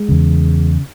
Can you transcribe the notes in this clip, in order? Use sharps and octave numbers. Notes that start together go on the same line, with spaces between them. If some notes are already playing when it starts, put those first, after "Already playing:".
Already playing: G#3
E2 C#3